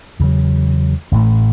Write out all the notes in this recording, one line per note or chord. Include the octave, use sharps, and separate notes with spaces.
E2 C#3 F#3
A1 A2 E3 A3